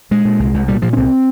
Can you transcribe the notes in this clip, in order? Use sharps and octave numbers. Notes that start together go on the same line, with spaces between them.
A#2 G#3
A#2
C2
C2
A#2 G3
A#2 F3
C#4
C2 C4